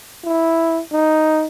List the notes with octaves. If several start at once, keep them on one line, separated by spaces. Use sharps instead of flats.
E4
D#4